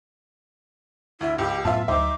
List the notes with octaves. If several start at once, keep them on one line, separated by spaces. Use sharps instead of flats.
D2 E4
C#2 G4 E6
F#2 A2 B3 F4 E5 A5
D2 F#3 D#4 C5 E5 D6